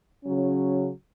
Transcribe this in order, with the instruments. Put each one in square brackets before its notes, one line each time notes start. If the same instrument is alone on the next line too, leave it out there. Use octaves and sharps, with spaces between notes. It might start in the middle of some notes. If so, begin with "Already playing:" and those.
[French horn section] C#3 F#3 C#4